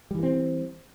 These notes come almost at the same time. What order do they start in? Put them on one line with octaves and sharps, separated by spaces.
G3 E3 A#3 C4